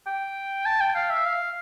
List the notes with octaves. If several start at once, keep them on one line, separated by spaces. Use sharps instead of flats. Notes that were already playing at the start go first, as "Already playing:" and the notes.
G5
A5
G5
F5
E5
F5